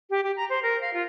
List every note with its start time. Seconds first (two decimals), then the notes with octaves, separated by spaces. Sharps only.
0.10 G4
0.23 G4
0.36 A#5
0.50 C5
0.63 A#4
0.81 F5
0.93 F4